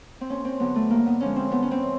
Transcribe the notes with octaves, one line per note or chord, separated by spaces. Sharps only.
C4
D#2 C#4
C4
D3 F#3 B3
A3
G2 A#3
B3
D3 F3 G#3 C#4
C4
G2 B3
C#4
C4
E3